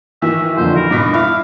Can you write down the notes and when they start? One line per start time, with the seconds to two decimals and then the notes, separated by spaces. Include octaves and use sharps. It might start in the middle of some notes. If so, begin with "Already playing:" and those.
0.22 D#3 E3 F#4 E5
0.57 F2 A#2 D3 C5
0.76 F#4 A#4 B5
0.90 G2 B2 D6 B6
1.14 E4 F5